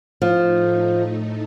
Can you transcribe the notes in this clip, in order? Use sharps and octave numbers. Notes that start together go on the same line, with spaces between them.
A2 F3 A3 D#4